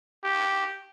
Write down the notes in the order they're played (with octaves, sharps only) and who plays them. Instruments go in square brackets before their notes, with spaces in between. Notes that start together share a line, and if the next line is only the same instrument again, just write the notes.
[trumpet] G4